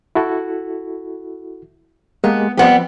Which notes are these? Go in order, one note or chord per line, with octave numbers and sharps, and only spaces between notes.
E4 F#4 A4
G#3 A#3 B3 G4
F3 G3 B3 C4 G4